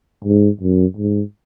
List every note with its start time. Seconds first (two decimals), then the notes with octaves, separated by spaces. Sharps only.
0.25 G#2
0.61 F#2
0.97 G#2